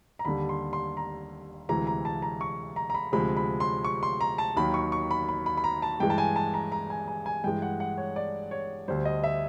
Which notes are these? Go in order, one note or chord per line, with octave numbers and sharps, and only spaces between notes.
A#5
D#2 D3 G3 B5
C6
C6
A#5
D2 C3 E3 G#3 A#5
A#5
A5
A#5
C#6
A#5
A#5
B5
D2 C3 F3 G#3 B5
B5
C6
C#6
C6
A#5
A5
D#2 D#3 F#3 B5
C#6
C#6
B5
B5
B5
B5
A#5
A5
G2 E3 G#3 G5
A5
G#5
A5
A#5
A#5
G#5
G#5
G#5
G2 E3 G#3 G5
F#5
F#5
C#5
D5
C#5
D2 D3 G3 C5
D#5
E5